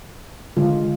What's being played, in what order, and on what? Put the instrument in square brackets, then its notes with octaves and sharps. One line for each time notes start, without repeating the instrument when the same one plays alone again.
[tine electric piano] D3 [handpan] G#3 F4